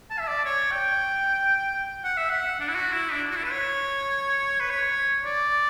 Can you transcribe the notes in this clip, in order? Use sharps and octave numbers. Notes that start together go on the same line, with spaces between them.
A5
E5
D5
C#5
G5
F#5
E5
F#5
D4
E4
F#4
E4
D4
F#4
E4
B4
C#5
B4
C#5
D5